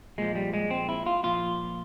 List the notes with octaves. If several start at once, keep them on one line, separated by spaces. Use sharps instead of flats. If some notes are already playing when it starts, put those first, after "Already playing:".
A#2 F3 G#3
G3
G#3
C4
E4
F4
A#2 F3 F4